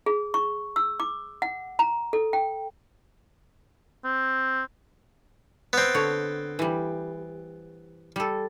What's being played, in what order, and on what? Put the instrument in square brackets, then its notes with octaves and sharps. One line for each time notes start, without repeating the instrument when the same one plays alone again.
[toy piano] G#4
C#6
E6
D6
F#5
A#5
A4
G5
[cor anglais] C4
[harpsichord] B3 C4
[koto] D3 C#5
E3 G3
G3 A4